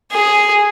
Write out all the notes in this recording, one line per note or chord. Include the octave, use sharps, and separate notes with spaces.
G#4